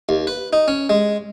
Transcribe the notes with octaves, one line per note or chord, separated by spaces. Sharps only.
D#2
B4
D#4
C#4
G#3